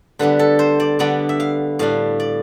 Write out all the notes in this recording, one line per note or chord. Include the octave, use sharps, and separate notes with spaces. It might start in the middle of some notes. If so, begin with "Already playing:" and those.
D3 G3 B3 D4 B4
A4
C5
D5
D3 G3 B3 D4 D5
E5
F5
A2 G3 D4 F5
D5